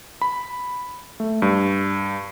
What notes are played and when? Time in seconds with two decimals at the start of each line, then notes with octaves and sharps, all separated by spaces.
0.22 B5
1.20 A3
1.42 G2